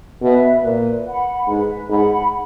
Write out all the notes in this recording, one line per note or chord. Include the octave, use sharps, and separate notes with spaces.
B2 B4 E5
A#2 B4
F#5 B5
G#2 B4
G#2 F#5 B5